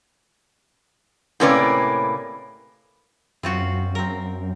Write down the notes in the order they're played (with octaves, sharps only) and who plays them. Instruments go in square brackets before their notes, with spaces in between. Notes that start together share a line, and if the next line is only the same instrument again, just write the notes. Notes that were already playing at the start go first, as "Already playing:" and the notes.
[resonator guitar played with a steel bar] A2 C3 A#3 C#4 B4 D5
[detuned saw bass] F#2 [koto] C4 F4 F#4
[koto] C4 A#4